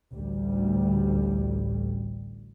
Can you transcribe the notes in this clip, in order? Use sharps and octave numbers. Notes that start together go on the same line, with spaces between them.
A1 D2 G3